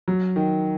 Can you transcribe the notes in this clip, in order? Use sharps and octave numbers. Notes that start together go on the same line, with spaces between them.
F#3
D#3